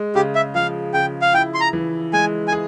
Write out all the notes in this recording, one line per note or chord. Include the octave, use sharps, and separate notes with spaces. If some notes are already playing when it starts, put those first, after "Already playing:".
Already playing: G#3
C#3 G4
E5
F3 F5
C#3 G5
F5
E4 G5
C6
A#5
E3
G#3 G#5
G#5
G#4